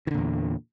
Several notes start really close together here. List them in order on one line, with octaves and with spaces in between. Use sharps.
D#3 D3 A#2 E2